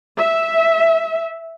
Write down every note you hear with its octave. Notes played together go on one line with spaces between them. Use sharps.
E5